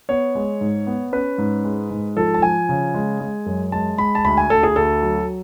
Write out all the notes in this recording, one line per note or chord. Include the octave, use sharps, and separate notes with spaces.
B3 C#5
G#3
G#2
B3
C#4 B4
G#2
G#3
G#2
F3 A4
A5
F3 G#5
C#3
G#3
G#3
F#2
G#3 A5
G#3 B5
A5
D2 B5
G#5
D2 A4
G#4
D2 A4
F#3